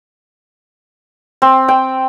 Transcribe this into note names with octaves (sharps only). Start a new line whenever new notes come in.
C4
G5